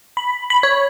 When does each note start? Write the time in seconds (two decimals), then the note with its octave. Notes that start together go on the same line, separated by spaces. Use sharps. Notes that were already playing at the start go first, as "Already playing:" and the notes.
0.17 B5
0.50 B5
0.63 C#5